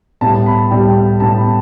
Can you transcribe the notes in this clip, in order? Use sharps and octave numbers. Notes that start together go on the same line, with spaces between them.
A2 G3 B3 A5
B5
A2 G3 B3 G5
A2 G3 B3 A5
B5